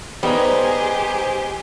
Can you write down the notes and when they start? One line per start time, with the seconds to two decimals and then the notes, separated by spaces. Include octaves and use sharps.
0.23 G3 B3 D#4 G4 G#4 C5 A#5